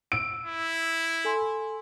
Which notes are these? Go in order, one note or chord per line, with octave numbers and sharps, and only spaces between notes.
E6 D7
E4
A4 G#5 C6